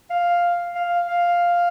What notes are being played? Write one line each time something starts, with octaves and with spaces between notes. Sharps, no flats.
F5
F5
F5